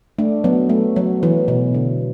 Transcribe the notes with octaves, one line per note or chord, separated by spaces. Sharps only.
A3 D4
F#3 B3
A3
F#3
E3
B2
D3